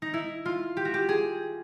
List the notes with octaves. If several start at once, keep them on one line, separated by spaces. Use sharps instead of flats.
D#4
E4
F4
G4
F#4
G4
G#4